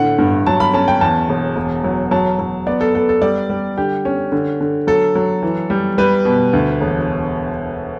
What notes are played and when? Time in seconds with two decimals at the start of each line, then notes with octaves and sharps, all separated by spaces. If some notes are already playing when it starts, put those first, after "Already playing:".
Already playing: A2 D3 F#5
0.18 G2
0.47 F#3 A5
0.60 B5
0.74 C#4 A5
0.88 G5
1.01 E2 A5
1.29 E1
1.56 E1
1.84 F#3
2.11 F#3 A5
2.39 F#3
2.66 B3 D5
2.81 A4
2.94 B3 A4
3.09 A4
3.22 G3 D5
3.50 G3
3.77 D3 G4
4.05 C#4
4.32 D3
4.60 D3
4.87 F#3 A4
5.15 F#3
5.43 E3
5.70 G3
5.98 G3 B4
6.25 B2
6.53 D2
6.81 E1